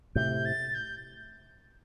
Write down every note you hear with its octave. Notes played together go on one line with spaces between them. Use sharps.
A2 C3 G6
A6
G6